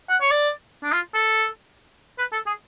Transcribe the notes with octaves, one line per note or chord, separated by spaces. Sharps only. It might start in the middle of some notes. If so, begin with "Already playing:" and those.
F#5
C#5
D5
D4
F4
A4
B4
A4
G#4